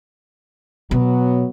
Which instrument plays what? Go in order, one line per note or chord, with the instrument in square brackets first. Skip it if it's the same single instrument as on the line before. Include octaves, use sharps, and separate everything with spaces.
[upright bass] B2 [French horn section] F#3 B3